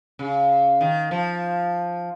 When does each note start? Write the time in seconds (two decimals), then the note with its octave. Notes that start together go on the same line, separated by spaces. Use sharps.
0.19 C#3
0.81 D#3
1.11 F3